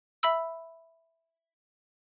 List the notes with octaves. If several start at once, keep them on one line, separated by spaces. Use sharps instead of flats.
E5 B5 E6